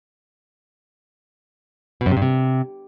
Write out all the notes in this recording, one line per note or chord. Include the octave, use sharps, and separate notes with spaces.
B2
F#2
C3
G2
C3